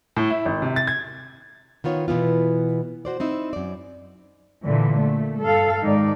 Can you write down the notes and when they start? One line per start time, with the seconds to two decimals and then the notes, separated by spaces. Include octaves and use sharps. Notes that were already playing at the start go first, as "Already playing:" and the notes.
0.16 A2
0.30 E4
0.45 G#1
0.62 C3
0.76 A6
0.87 G#6
1.84 D#3 B3 F4 C#5
2.08 B2 E3 B3 F4
3.05 F#4 C5 D5
3.20 C4 D#4 E4
3.53 F#2 D5
4.65 A#2 D3 E3
5.00 A3
5.41 G2 A4 F5
5.81 G#2 D#3 D#4 D5